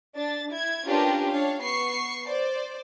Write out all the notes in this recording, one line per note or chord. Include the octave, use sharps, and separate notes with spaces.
D4 A6
E4 G#6
C#4 D4 F4 G4 A#4 B4
D4 C#5 F5
B3 C#6 C7
C5 D5